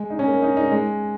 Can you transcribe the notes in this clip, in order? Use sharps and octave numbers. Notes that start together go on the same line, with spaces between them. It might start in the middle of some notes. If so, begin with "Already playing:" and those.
Already playing: G#3
D#4
C#4
A#3
D#4
D#4
G#3